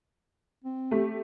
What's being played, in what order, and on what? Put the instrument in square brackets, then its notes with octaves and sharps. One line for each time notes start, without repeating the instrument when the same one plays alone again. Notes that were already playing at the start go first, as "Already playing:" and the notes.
[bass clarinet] C4
[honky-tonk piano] A3 G4